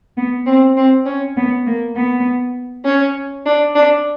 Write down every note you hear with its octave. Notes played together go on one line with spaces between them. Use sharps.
B3
C4
C4
C#4
B3
A#3
B3
C#4
D4
D4